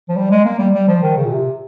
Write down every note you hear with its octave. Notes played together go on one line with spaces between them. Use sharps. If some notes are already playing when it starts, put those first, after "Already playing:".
F3
G3
G#3
A#3
G3
G3
F3
D#3
C#3
A#2
C3